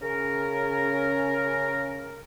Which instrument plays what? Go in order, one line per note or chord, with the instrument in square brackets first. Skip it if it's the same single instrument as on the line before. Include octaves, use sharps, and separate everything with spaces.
[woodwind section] C#3 C#4 A#4